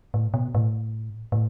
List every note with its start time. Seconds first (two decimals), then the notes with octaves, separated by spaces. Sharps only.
0.14 A2
0.34 B2
0.55 A2
1.32 A2